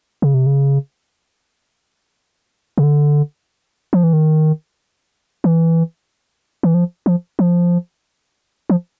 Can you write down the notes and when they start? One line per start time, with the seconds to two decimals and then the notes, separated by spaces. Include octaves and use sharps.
0.22 C#3
0.34 C3
0.46 C#3
2.78 C#3
2.83 D3
3.93 F3
4.04 E3
4.13 D#3
5.44 E3
6.63 E3
6.74 F3
7.06 F3
7.39 F3
8.70 F3